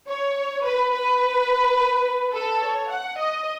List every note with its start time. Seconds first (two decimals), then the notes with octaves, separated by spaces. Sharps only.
0.09 C#5
0.65 B4
0.93 B4
2.33 A4
2.61 C#5
2.90 F#5
3.18 D#5